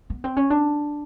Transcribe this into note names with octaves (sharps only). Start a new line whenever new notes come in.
B3
C4
C#4
D4